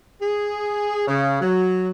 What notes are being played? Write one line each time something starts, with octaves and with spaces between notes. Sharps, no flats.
G#4
C#3
F#3